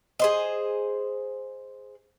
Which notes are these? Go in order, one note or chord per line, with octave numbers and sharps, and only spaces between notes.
G#4 C5 D#5